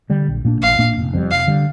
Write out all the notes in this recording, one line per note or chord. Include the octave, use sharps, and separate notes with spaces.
D3 G3
A#1
A#2 A#3 D4
A#1 F5
A#2 A#3 D4
F1
F2 D3 G3
F1 F5
D3 G3